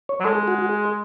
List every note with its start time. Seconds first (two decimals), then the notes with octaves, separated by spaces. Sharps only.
0.09 C#5
0.20 F#3
0.24 G#3 A4
0.35 G#4
0.48 F#4
0.58 F#4
0.69 G#4